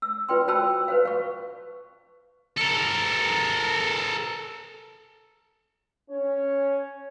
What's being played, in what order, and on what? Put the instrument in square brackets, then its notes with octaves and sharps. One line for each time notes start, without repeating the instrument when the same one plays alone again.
[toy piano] E6
F4 B4 G5 C6
F#4 C5 G5 A5 B5 E6
B4 C5 F5
F5 C#6
[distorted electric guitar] A4 A#4
[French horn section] C#4 C#5